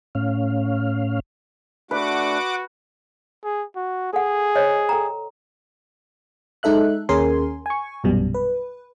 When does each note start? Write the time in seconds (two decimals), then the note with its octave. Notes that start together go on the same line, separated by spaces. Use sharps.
0.15 A2 C#4 F5
1.91 A3 D4 F#4 B4 F#5 D6
3.44 G#4
3.76 F#4
4.13 G#4 A4 F#5
4.55 C5 C#5 D#5
4.89 A4 G5 A#5
6.63 G#3 D#4 A4 E5 F#6
7.09 D#2 C#4 G#4 A#4 G#5 C6
7.66 G#5 C#6
8.04 A#1 F#2 B2 G3
8.34 B4